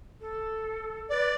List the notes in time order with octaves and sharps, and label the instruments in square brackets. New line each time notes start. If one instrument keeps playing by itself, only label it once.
[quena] A4
[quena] B4 [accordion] D5